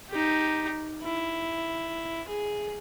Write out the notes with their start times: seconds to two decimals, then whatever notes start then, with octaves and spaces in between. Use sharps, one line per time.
0.10 D#4 G4
1.03 E4
2.28 G#4